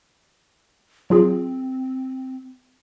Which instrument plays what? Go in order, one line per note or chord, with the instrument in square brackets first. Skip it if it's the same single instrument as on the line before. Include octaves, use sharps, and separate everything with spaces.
[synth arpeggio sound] F#3 F4 G#4 [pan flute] C4